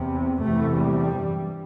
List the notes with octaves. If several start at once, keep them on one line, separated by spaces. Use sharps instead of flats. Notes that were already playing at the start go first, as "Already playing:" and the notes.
Already playing: E2 C3
E2 C3 A3
G3
G2